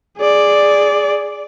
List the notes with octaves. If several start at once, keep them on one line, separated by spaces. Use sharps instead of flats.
G#4 D5